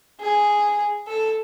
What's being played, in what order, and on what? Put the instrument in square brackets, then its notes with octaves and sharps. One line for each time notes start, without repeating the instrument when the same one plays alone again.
[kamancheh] G#4
A4